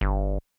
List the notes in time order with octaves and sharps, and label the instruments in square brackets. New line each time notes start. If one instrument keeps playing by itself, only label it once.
[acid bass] G1